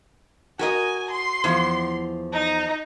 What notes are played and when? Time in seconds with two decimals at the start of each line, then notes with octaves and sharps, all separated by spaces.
0.59 F#4 A#4 D#5 G#5
1.11 C6
1.44 E2 F3
2.33 D#4